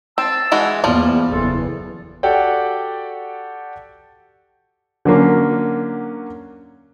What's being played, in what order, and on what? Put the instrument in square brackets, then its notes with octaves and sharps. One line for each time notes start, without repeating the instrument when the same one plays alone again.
[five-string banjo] C4 [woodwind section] A5 E6
[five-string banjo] E3 G#3 F#4
[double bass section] E2 [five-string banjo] F3 G3 [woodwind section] A#3
[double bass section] F#1 E2 E3 [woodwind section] F4 A4
[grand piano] F#4 G4 A4 D5 F#5 G5
[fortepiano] D3 F#3 A#3 C#4